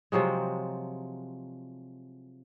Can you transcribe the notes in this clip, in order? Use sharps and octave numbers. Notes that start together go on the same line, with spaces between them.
C3 F3 F#3 G#3